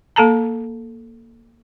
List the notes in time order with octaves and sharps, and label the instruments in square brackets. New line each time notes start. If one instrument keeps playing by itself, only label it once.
[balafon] A#3 A4 A5 A#5